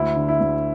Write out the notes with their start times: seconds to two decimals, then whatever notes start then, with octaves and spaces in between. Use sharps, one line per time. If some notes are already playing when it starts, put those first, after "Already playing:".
Already playing: D2 E4
0.17 D3
0.29 E4
0.40 D2